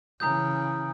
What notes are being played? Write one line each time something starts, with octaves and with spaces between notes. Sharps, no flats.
C#3 E3 A#5 D#6 G6